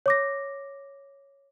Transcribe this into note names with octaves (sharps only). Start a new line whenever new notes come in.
C#5 D6 A#6